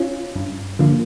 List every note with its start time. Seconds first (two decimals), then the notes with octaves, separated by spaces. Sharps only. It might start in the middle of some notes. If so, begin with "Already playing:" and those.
Already playing: C#4 F4
0.35 G2
0.79 D3 F3 A#3